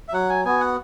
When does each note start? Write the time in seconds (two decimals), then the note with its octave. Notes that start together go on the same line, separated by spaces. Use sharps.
0.08 E5
0.13 F#3 F#5
0.29 G#5
0.45 B3 F#4 G#5
0.60 F#5